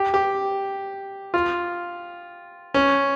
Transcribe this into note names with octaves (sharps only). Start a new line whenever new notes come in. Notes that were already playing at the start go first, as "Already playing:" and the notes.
Already playing: G4
G4
F4
C#4